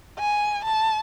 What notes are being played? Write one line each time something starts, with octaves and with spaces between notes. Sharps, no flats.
G#5
A5